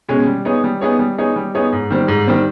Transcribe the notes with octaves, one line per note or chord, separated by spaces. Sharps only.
B2 G#3 C#4
G3
B3 D#4 G#4 C#5
G3
B3 D#4 G#4 C#5
G3
B3 D#4 G#4 C#5
G3
B3 D#4 G#4 C#5
G#2
D#3 G3 C4
G#2
D#3 G3 C4